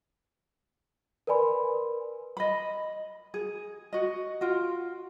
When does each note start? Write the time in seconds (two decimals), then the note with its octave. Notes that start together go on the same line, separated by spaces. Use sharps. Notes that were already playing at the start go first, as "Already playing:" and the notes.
1.27 A#4 B4 D5 G#5 B5 C6
2.37 D#5 B5
3.34 G#4
3.93 F#4 D#5
4.41 F4 F#4